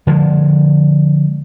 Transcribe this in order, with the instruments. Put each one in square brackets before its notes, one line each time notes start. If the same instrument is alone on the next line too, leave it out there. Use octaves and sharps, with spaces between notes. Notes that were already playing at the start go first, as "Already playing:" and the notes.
[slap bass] D3 F3 G#3